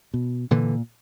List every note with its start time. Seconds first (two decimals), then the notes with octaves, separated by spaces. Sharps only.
0.14 B2
0.51 A#2 D3 E3